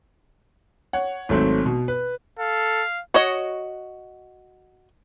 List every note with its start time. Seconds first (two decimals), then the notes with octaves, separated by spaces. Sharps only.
0.93 C#5 F#5
1.29 G#1 F#3 A3 C4
1.66 B2
1.88 B4
2.39 A4 F5
3.14 F#4 C#5 D#5